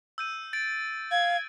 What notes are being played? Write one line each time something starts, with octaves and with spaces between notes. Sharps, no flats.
E6 G6 D#7
A6 D7
F5 G#6